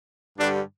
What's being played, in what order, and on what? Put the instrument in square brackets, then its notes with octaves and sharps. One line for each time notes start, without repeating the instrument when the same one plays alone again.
[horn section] G2 D3 G3 D4